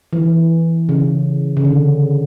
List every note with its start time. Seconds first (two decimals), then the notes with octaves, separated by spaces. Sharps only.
0.13 E3
0.89 C#3
1.57 C#3
1.65 D3